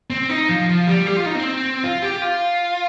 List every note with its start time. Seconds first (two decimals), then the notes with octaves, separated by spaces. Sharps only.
0.10 C4
0.29 D#4
0.49 F3
0.69 F3
0.87 G3
1.07 G4
1.17 F4
1.26 D#4
1.35 C4
1.84 F4
2.02 G4
2.22 F4